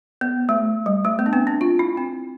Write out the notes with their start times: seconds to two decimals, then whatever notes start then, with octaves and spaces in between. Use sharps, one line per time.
0.21 B3
0.49 A3
0.86 G3
1.05 A3
1.19 B3
1.26 D4
1.33 C4
1.47 D4
1.61 F4
1.79 E4
1.97 C4